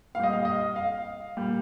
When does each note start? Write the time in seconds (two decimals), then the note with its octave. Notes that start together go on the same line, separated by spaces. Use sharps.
0.15 A#2 F5
0.20 G3 D#5
0.33 F5
0.45 D#5
0.76 F5
1.37 A#2 G3